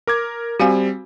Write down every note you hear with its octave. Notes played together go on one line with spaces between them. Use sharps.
A#4 D6 G#6
G3 C4 F#4 F5 G#5